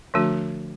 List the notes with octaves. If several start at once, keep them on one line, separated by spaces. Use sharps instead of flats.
D3 F3 A3 D4 F#4